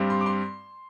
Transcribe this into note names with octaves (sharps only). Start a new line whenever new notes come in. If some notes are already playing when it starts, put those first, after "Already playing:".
Already playing: G2 G3 C4
C6
D6
C6